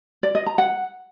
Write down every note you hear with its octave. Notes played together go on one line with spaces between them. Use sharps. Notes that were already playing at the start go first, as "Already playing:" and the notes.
D5
D#5
A#5
F#5